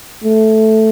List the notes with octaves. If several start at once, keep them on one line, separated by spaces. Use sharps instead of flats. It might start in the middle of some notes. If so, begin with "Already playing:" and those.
A3